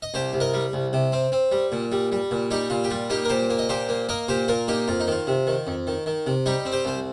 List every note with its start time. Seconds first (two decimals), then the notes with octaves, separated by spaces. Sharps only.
0.02 D#5
0.14 C2 G4 C5
0.33 C2
0.40 A#4 D#5
0.54 G3
0.73 C2
0.93 C3
1.12 C4
1.32 C4
1.52 G3
1.72 A#2
1.92 G3
2.12 G3
2.31 A#2
2.51 G3 D#4 G4
2.70 A#2 F4
2.84 G4
2.90 G3 F4
3.10 A#3 D#4 G4
3.25 A#4
3.29 A#2 G4 C5
3.50 A#3
3.59 D#5
3.69 A#2 G4 C5
3.89 A#3
4.09 A#3 A#4 D#5
4.28 A#2 G4 C5
4.48 A#2 F4 A#4
4.68 A#3 D#4 G4
4.88 F2 F4
5.00 D#4
5.07 D#3 F4
5.27 C3
5.47 D#3
5.67 F2
5.87 D#3
6.06 D#3
6.26 C3
6.46 G3 D#4 G4
6.65 C4
6.72 G4 C5
6.85 C2 C5